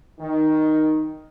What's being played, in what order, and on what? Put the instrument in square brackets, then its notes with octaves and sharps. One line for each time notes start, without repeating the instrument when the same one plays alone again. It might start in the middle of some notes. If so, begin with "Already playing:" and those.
[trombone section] D#3 [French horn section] D#4